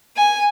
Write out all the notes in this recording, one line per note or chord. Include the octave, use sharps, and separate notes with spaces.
G#5